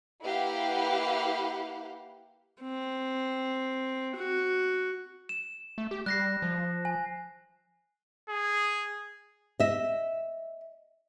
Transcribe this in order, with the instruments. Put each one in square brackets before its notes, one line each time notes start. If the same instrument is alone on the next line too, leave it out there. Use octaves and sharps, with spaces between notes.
[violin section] A#3 E4 G4 B4 F5 F#5
[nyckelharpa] C4
F#4
[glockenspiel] E7
[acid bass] A3
G4
[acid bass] G3 [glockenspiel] F#6 A#6 C7
[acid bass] F3
[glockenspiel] G#5
[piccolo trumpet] G#4
[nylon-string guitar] D#5 E5